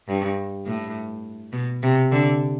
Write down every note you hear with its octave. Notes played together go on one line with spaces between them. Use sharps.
G2
A2
B2
C3
D3